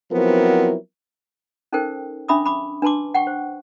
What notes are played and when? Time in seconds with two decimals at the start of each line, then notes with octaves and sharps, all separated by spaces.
0.11 F3 F#3 B3 C4 E4 A#4
1.73 C#4 D#4 A4 A#4 C5 G5
2.28 C#4 D4 E5 B5 D6 D#6
2.46 B5 D6
2.82 D4 B4 A5 C6 D6
3.14 F#5 G5 C#6
3.27 C5